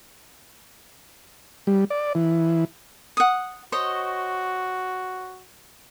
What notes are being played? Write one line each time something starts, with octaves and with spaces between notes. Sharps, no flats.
G3
D5
E3
F#5 D#6
F#4 C5 C#5 D#5